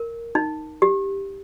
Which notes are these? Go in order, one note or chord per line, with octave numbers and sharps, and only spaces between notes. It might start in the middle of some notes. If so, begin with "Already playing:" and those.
Already playing: A#4
D#4
G4